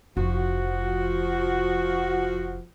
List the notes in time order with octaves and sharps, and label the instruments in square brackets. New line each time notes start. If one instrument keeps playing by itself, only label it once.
[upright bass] F1 [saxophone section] F3 F#4